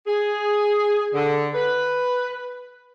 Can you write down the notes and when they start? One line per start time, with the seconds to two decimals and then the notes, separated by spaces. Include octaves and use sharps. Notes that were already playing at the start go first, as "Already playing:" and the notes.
0.07 G#4
1.14 D3
1.54 B4